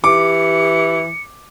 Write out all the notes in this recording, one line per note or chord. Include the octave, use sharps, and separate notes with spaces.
E3 G4 D6 C#7